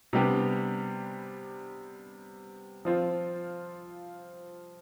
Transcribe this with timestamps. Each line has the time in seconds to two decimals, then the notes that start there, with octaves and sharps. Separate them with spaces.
0.13 C3 G3 B3 D4 G4
2.85 F3 C4 F4